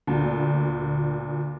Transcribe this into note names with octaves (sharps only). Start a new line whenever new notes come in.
D2 A#2